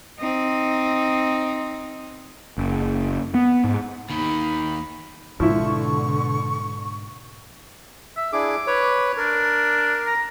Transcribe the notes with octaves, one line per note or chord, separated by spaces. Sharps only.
C4 D#4
F#1
B3
G#2
D#2 D#3 D#4 B5
G#2 B2 D3 F3 E4 C#6
E5
D4 E4 G#4 D6
B4 C#5
D4 A#4
A#5